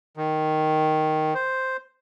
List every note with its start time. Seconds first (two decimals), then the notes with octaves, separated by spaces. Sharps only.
0.17 D#3
1.34 C5